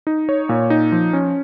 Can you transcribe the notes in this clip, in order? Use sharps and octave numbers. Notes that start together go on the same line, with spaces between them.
D#4
C#5
A#2
D#4
F3
C#4